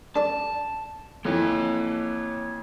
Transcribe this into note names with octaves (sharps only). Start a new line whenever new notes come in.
D4 A4 D5 A5
F2 E3 A#3 C#5